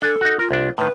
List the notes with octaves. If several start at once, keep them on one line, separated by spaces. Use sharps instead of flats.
D4 A4 G#5
D#4 F#4
F4 A#4
C2 D4
A2 D#3 B4